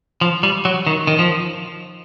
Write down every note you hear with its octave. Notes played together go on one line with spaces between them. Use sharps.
F3
G3
F#3
D#3
D#3
F3